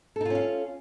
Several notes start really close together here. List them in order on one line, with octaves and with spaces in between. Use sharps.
A4 D#4 F4 C#4 F5